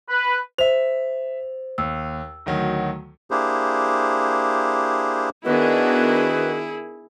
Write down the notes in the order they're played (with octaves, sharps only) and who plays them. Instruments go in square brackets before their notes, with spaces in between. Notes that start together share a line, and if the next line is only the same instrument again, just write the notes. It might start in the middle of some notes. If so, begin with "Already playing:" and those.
[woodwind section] B4
[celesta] C5 [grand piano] E5 F7
[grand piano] D#2 [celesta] E6
[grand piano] D2 D#3 F#3
[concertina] A#3 D4 E4 G4 G#4 C5
[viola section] D#3 B3 D4 [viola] E4 G#4 [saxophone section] F#4 D#5 [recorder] B4